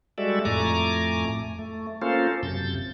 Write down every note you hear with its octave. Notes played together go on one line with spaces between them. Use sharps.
G3 G#3 F#4 A4 D5 E5
F2 A2 A3 G#5 A#5 D6
A3
A#3 C#4 F4 A4 C5
F#2 C3 G6 A6